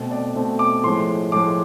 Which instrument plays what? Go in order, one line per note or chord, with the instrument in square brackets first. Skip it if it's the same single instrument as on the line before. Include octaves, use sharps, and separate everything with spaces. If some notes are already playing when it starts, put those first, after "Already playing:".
Already playing: [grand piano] B2 A3 C4
D5
B2 A3 C4
D6
A2 F3 G#3 C6
A2 F3 G#3 D6